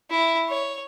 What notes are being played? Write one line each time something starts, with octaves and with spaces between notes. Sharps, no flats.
E4
C#5